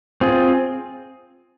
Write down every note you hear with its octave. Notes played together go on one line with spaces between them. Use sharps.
C4 F4 G#4